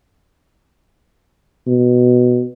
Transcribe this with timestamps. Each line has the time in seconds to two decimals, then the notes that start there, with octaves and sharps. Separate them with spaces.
1.67 B2